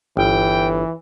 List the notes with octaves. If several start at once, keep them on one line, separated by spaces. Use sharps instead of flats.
G1 E3 G5